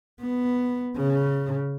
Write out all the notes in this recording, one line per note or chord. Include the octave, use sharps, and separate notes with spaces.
B3
C#3